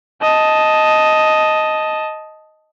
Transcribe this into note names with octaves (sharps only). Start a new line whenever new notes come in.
D#5 A5